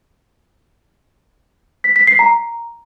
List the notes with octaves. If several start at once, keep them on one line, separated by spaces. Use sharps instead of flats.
B6
B6
C7
A#5